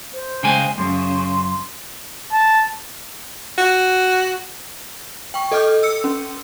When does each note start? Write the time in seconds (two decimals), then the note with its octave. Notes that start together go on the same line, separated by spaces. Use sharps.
0.13 C5
0.43 C#3 G#3 G5 G#5
0.78 F#2 C#3 C6
2.32 A5
3.58 F#4
5.34 G5 C#6
5.52 A4 D#5 D6 F6 G6
5.83 E6 C#7
6.04 C#4